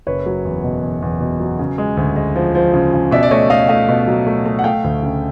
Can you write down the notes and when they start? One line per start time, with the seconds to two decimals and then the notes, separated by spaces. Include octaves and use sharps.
0.07 F#1 B4 C#5
0.26 F#3
0.45 E2
0.63 B2
0.83 E2
1.02 E2
1.21 B2
1.40 F#3
1.59 C#3
1.78 G#3
1.97 D2
2.16 G#3
2.36 F3
2.55 F3
2.74 C#3
2.93 C#3
3.11 B2 D5 E5
3.23 D5
3.31 A3 C#5 D#5
3.49 A3 D#5 F5
3.69 A3 D#5 F5
3.88 B2
4.08 F#3
4.27 A3
4.46 A3
4.59 F#5
4.64 A3 F5 G5
4.84 D2
5.02 C#3